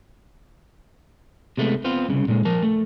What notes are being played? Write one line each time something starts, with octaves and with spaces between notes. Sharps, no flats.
C3 G#3 A3 B3
B3 C4 F4
C2 C#3
A#2 G#3
F3 A#4 A5
A3